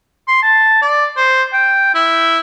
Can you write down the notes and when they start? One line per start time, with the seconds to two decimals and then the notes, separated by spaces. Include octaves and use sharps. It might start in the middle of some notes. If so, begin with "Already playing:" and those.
0.28 C6
0.43 A5
0.82 D5
1.17 C5
1.53 G5
1.94 E4